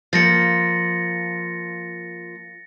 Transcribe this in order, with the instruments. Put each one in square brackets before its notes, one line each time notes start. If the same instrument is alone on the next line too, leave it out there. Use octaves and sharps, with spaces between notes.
[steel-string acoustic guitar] F3 A#3 [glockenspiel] A6 A#6 C#7